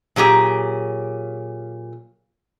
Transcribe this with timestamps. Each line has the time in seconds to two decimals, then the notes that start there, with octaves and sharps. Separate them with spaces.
0.16 A#2 F#3 G4 G#4